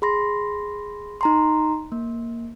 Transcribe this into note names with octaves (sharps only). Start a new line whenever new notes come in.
G#4 B5 C6 A#6
D#4 A#5 C6
A#3